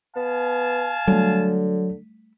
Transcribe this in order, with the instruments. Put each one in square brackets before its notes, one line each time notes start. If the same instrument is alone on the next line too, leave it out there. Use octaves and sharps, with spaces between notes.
[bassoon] B3 [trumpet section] F5 G#5 A5
[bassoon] D3 [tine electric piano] F#3 [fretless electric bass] G3 A3